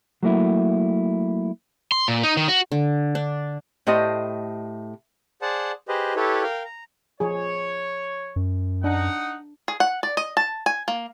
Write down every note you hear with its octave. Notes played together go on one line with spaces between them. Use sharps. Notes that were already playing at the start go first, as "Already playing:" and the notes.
F#3 A3 A#3 E4
C6
A#2
D#4
D#3
F#4
D3
D4
A2 A3 G4 C5 D#5
G#4 C5 D5 F#5 A5
G4 G#4 B4 C5 D#5
E4 G4 A4 B4 C#5
A#4 F5 G5
A#5
F3 G#4 C#5
F#2
D4 D#4 F#5
G#4
F#5
D5
D#5
A5
G#5
A#3